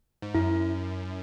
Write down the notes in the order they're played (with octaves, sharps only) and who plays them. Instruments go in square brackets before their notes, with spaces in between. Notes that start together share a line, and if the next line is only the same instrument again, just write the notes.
[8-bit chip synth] G#2
[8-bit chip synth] F#2 [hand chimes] E4